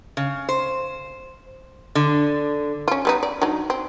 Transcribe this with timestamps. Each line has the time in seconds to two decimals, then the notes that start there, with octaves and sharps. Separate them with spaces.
0.17 C#3
0.49 C5
1.95 D3
2.88 C#4 F4
3.05 G3 B3 D#4
3.23 D5
3.42 F#3 D4 D#4
3.70 C4